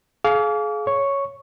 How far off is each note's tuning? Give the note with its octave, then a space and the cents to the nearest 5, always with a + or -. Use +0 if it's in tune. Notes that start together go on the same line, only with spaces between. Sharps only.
G#4 +35 F5 +0 D6 -40
C#5 +0 C#6 +0